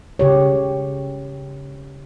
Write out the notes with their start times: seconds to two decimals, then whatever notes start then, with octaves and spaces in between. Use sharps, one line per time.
0.19 C#3 G4 C#5